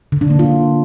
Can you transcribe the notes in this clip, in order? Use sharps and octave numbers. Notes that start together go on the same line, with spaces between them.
D3
D4
A#3
F4